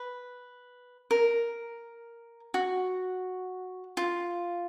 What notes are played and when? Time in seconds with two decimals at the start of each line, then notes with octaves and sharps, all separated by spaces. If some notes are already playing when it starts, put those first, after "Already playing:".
Already playing: B4
1.11 A#4
2.54 F#4
3.97 F4